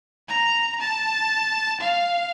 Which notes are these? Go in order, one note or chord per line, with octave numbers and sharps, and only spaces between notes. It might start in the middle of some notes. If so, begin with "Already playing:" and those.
A#5
A5
F5